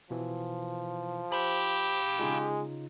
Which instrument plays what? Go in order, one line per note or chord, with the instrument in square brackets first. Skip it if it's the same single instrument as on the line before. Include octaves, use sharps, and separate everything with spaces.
[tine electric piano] B2 E3 [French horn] F3
[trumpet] G4 [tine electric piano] C5 [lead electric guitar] F5 B5
[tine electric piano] C#3 D#4 F4 [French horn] G#3